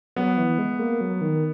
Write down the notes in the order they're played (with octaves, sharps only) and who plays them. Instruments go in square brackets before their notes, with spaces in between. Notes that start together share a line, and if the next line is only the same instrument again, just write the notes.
[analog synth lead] F#3 [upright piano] B3
[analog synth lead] E3
G#3
A#3
F#3
D#3